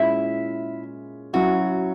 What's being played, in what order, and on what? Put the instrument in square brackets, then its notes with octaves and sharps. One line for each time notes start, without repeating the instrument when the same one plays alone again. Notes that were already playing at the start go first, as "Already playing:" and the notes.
Already playing: [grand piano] A#2 G#3 C#4 [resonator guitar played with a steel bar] E4
[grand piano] F#3 C#4 E4 [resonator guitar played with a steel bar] F#4